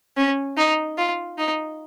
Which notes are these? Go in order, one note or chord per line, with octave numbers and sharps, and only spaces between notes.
C#4
D#4
F4
D#4